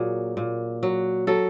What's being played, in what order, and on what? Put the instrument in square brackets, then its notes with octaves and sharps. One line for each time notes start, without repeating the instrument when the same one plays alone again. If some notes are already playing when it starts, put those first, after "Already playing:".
Already playing: [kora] A#2 F#3 G#4
A#2
F#3
F#3 A4